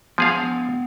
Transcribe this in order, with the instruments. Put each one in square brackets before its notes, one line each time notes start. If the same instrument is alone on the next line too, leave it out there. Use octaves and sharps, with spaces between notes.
[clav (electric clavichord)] F3 G#4 F5 [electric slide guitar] B3 G5